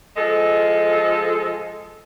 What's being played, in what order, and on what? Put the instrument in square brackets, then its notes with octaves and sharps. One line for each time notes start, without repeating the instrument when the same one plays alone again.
[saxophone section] F3 G#3 A4